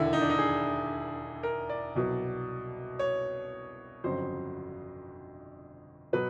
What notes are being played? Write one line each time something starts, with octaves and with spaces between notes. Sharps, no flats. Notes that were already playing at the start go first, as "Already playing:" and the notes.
Already playing: E1 D#2 D3 E4
D#4
D4
D#4
G#4
A#4
D5
C2 B2 F#3
C#5
G1 F2 C#3 F#3 C5
B2 F#3 B4